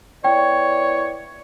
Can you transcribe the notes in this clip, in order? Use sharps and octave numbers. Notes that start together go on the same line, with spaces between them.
B3 E4 C#5 D5 G5